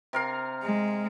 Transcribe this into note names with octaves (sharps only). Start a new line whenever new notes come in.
C3 A#4 F5
G#3